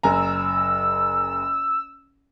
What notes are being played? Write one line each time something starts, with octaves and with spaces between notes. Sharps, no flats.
F#1 G#5 A#5 E6